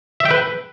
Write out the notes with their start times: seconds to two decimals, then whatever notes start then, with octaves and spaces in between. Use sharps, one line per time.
0.20 E5
0.25 G5
0.31 B4